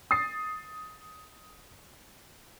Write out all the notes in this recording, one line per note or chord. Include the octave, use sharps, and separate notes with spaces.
D#6 A6 C7